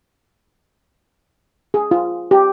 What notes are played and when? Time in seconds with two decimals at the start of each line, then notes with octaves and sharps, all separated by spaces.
1.74 G#4
1.91 F4
2.31 G4